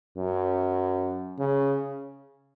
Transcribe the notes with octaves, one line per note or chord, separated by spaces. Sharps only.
F#2
C#3